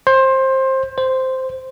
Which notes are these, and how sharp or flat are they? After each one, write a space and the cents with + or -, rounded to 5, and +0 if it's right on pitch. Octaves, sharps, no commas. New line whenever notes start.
C5 +20
C5 -5